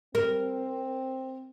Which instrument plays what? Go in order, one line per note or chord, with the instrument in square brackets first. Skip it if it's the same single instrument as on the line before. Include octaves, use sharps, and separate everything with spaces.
[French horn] C4 [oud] A#4